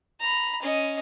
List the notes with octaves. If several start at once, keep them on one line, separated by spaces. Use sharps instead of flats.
A#5 B5
C#4 D#5